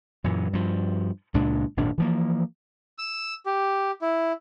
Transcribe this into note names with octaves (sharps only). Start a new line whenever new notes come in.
F#2 A#2 E3
G2 F3
C#2 A#2 G#3 D4
G#1 F#2 A#2 D4
E3 F3 A#3
E6
G4
E4